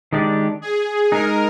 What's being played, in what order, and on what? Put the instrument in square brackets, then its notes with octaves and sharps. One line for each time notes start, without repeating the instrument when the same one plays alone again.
[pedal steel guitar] D#3 G#3 D4 G4 D5
[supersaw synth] G#4
[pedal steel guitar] G#3 D#4 G#4 [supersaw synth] A#4